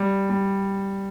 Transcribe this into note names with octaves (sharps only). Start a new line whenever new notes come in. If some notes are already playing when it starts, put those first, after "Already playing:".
Already playing: G3
G3